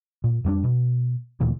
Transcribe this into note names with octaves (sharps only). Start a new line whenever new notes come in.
A#2
F2 G3 C#4 D4
B2
D#1 D2 A#2 E3